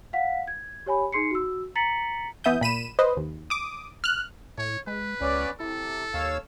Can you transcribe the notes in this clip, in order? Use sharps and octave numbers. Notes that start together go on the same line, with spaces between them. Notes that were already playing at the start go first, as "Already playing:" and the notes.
F5 F#5 B6
G#6
G4 C#5 G#5 B5
D#4 G#4 C6 C7 C#7
F#4 E6
A#5 A6 B6 C#7 F#7
E3 B3 E5 D#6 G6
A#2 B5 D#7 E7
B4 C5 D#5
D#2
D6 D#6
F6 F#6
A2 C#5
G#3 B4
C#2 B3 C#4 D5
C3 E4 A4
D#2 C#5 F5 E6